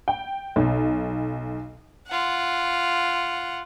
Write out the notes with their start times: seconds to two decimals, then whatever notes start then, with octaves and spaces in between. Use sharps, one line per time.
0.08 G5
0.56 B1
2.07 F4 F#5